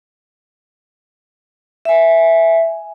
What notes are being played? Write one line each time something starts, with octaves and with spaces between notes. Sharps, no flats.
E5 G#5